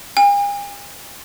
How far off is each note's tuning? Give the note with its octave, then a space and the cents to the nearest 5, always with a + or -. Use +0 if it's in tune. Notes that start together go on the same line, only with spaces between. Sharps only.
G#5 -45